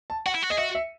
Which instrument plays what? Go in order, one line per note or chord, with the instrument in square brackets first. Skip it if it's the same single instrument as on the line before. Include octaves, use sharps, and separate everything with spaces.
[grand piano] A5
[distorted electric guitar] F#4 [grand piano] F#5
[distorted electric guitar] E4
F#4
[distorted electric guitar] G#4 [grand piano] D#5
[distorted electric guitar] F#4 [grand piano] E5
[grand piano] E5